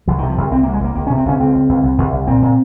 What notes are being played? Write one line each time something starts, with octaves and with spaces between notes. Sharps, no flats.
C2 F3
D#3
C3
F3
C2
C2 C4
A#3
C2
G#3
C2 A#3
C#2 A#3
C#4
C3
C4
C#2 C#4
C#2 C4
C#2
C#2
C2
C2
C2
A#2 C4
A#2